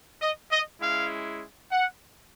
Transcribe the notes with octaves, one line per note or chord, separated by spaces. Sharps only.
D#5
D#5
G#3 C#4 E4 F5
F#5